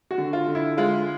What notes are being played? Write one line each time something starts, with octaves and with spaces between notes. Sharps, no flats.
F#4
D3
F4
D3
E4
G#3 F4